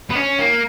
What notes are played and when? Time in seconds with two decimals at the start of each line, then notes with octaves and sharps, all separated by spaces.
0.10 B3
0.15 C#4
0.39 A#3